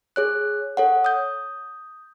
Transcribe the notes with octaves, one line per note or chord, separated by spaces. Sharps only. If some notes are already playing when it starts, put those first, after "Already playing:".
G#4 C#5 F#6
A4 C#5 F#5
D#6 G6